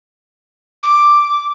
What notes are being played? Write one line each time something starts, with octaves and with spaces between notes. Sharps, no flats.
D6